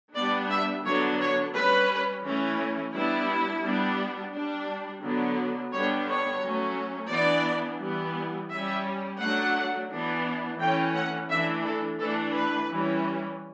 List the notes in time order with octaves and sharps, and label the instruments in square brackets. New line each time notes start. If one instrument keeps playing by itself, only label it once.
[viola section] G3 B3 D4 D5
E5
D3 F#3 B3 D4 C#5
C#5
G3 C#4 B4
E3 A3 C#4
G3 B3 D4 E4
G3 B3 D4
G3 D4
D3 F#3 B3 D4
D3 G3 B3 D4 C#5
C#5
F#3 A3 C#4
E3 B3 D4 D5
E3 G3 B3
G3 C#4 E5
F#3 A3 D4 F#5
E3 B3 D4
E3 A3 C#4 G5
F#5
E3 A3 D4 E5
A4
E3 A3 D4 A4
B4
E3 G3 C#4